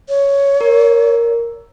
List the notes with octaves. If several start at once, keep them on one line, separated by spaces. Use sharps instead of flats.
C#5
A#4